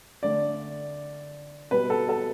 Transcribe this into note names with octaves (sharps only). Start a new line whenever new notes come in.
D3 A3 D5
B2 G3 B4
A4
A4